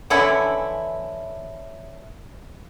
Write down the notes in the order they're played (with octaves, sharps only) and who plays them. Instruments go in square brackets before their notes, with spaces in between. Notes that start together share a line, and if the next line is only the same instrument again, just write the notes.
[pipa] D3 E3 C#4 E4